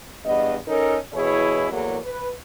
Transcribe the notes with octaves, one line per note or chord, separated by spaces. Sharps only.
E2 G2 B3 D#5
C#4 D#4 A4 A#4
B2 E3 E4 G#4 C#5
E2 A2 F#3 A#3 G#4
B4